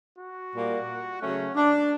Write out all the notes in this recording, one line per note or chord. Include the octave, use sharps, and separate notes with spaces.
F#4
A#2 G3 A#3
C#3 F#3 A3 C#4
D4